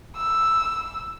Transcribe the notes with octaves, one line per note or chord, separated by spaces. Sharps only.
E6